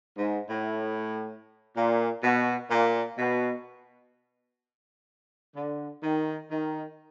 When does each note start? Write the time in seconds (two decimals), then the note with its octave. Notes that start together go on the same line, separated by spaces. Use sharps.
0.18 G#2
0.49 A2
1.76 A#2
2.23 B2
2.70 A#2
3.18 B2
5.56 D3
6.03 D#3
6.50 D#3